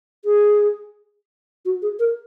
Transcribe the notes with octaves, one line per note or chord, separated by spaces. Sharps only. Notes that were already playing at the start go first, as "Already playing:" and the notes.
G#4
F#4
G#4
A#4